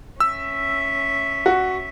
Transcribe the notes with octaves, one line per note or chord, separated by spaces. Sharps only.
C#4 E5 E6
F#4